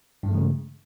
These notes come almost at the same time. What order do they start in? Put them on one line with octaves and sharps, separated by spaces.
G2 G#3 A3 E3 C#3